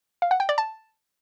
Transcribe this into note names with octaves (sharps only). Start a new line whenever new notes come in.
F5
F#5
G5
D5
A5